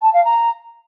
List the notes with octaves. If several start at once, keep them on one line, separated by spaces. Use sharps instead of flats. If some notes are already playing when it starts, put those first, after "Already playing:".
A5
F5
A#5